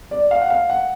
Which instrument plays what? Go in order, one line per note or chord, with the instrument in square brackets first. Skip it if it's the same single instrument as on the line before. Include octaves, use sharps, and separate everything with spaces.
[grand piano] D5
F5
F#5
F5
F#5